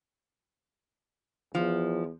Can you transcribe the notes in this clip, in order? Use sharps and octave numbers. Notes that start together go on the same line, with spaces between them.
E2 F3